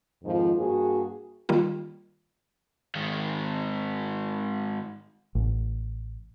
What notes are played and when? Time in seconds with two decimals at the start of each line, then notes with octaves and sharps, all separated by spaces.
0.24 F2 G#2 D#3 F3
0.56 G2 A#3 F#4 G#4
1.49 D#3 G3 A#3 F4
2.95 G#2 D#3
5.35 A1